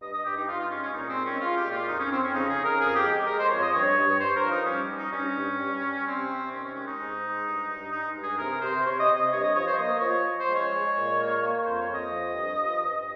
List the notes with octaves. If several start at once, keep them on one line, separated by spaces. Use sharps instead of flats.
G2 D#5
D#5
G2 G4
D#4
G2 F4
F4
G#3 C#4
C#4
A#2 D#4
C4
G#3
C#4
G#3 F4
G4
A#2
F4
F2 D#4
C#4
F2 C4
C#4
C#3 D#4
G#4
C#3
A#4
F2 G#4
G4
G#3
G#3 A#4
C5
F2 C#5
D#5
G2 C#5
G2
G2 C5
A#4
F3
D#4
G3 C#4
G3
D#4
G2 C#4
G2
G3
G3
C3 C4
C3
D#3 C#4
C#4
G#3 C#4
D#4
G#2
G#3
G2
G2
G#3 D#4
G2
G#4
C3 A#4
C3 C5
C3 C#5
D#5
C3
D#5
G2 C#5
D#5
F3 C#5
C5
A#3 D#5
F3 C#5
F3
C5
G#3
C#5
G#3
A#2
A#3
A#3
F2 C5
C#5
F2
D#5
F3
G2
F3
G2